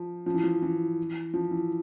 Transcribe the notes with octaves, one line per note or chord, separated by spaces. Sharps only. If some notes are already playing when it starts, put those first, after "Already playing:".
Already playing: F3
F3
E3
F3
E3
F3
E3